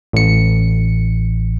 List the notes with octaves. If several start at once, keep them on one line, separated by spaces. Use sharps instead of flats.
A1 C#7